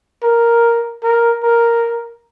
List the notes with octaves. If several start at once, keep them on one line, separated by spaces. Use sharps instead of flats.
A#4
A#4
A#4